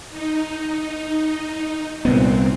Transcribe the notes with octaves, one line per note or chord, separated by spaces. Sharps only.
D#4
C2 A#2 B3 C4